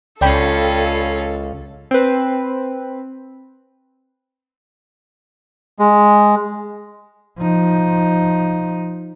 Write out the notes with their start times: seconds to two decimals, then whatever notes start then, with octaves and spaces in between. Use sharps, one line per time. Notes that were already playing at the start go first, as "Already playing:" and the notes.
0.21 C#2 C#4 F4 A4 D5 G5 B5
1.91 C4 B4
5.79 G#3
7.39 F3 D#4